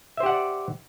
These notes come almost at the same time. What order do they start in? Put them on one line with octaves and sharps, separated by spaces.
E5 C5 G4 F#5 D5